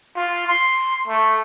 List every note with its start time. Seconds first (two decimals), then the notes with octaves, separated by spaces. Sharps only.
0.16 F4
0.47 C6
1.08 A3